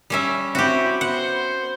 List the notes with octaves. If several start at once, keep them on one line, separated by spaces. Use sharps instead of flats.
G3 C#4 E5
C4 E4 F#4 G4
B3 C5 F#5